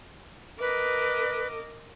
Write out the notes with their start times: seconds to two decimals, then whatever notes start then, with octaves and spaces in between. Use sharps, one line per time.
0.60 A#4 B4 D#5 D6